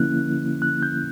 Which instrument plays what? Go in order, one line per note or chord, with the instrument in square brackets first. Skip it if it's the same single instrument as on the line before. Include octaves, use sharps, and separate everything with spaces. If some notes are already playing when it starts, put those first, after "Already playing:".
Already playing: [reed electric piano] D3 F3 A#3 C#4 E4 F#6
F#6
G6